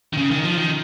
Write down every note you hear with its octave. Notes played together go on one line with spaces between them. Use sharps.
D#3
C#3
D#3
F3
D#3